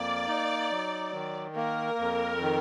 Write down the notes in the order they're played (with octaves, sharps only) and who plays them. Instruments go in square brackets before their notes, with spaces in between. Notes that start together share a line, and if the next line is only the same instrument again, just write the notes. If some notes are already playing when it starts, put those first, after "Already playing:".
Already playing: [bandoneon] F2 A#3 [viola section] D5
[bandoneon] D#4
F#3
D#3
[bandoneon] A#3 [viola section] A#4
[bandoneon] F2
D#3